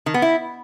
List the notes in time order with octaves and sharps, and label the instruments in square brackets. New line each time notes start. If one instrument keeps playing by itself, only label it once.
[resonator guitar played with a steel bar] D#3
B3
E4